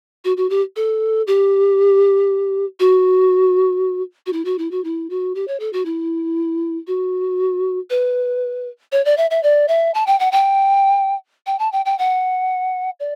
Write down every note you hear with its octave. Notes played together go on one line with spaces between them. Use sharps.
F#4
F#4
G4
A4
G4
F#4
F#4
E4
F#4
E4
F#4
E4
F#4
G4
C#5
A4
F#4
E4
F#4
B4
C#5
D5
E5
E5
D5
E5
A5
G5
F#5
G5
G5
A5
G5
G5
F#5
D5